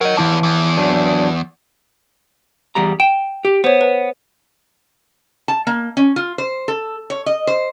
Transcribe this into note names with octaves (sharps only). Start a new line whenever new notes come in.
A#4 C#5 D#5 F#5
E2 E3 E4 A5
E2
F#3 D4
E2 G3 A#5
G5 E7
G4
B3 C5 C#5
B4
A5
A#3
C#4
F4
C5
A4
C#5
D#5
C5